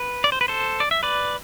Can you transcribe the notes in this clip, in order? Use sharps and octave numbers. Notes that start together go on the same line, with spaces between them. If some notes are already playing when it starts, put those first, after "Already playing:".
Already playing: B4
D5
C5
B4
A4 C5
D5
E5
B4 D5